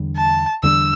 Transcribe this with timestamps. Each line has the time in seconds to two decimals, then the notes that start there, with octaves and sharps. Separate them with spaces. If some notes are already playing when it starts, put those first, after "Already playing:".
Already playing: E2 D3 G3 D4
0.16 A5
0.63 E2 D3 G3 D4 E6